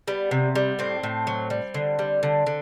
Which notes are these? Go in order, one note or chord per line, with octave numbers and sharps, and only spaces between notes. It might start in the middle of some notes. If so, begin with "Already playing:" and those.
G3 B3
C3
G3
A2 C4
A2
F#3
G3
D3
G3
D3
D3